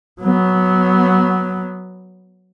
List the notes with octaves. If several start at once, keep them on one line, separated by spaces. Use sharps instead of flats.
F#3 B3